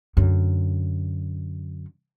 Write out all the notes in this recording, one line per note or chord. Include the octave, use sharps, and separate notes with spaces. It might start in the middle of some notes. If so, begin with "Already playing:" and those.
F#2 D3